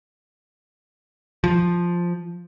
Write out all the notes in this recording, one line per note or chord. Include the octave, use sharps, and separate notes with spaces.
F3